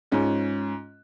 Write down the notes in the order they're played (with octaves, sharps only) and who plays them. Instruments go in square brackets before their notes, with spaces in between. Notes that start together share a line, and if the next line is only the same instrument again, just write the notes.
[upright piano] G#2 C#4 F4